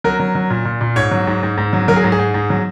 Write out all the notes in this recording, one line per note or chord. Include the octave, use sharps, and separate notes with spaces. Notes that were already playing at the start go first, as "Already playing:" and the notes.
F#3 A#4
F#3
F#3
A#2
A#2
A#2
G#2 C#5
F#3
G#2
G#2
G#2
F#3
F#3 A#4
G#4
G#2
G#4
G#2
G#2
F#3